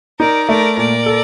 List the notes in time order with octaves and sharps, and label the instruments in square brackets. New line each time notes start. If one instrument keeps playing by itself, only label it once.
[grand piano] D#4 [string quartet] A#4 D5
[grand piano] A3 [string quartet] A#4 D5
[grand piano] A#2 [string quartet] A#4 D5
[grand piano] A4